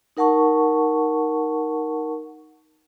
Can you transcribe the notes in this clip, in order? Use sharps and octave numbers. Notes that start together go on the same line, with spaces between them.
D#4 A#4 F#5 A5 C#6